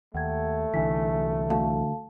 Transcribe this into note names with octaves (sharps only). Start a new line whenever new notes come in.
D#2 A3 F#5 G5 G#6
C2 D3 E3 E5 G#5 B6
D2 A4 F5 A5